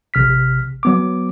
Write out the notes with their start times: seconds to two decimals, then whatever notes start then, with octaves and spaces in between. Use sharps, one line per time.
0.14 A1 C3 F6 B6
0.83 F#3 B3 D6